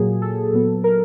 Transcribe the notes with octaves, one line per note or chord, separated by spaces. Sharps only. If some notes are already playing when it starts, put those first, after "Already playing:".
Already playing: A#2 F#3 A#3 G#4
A4
A#2 F#3 B3
A#4